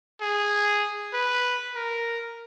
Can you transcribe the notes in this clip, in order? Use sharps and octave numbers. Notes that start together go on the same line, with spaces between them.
G#4
B4
A#4